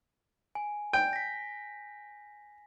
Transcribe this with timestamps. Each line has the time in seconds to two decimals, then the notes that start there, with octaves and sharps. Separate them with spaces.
0.55 G#5
0.93 G5
1.13 A#6 B6